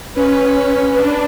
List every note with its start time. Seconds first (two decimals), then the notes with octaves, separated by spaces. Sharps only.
0.16 C#4 B4
0.92 C#4
0.97 D4 B4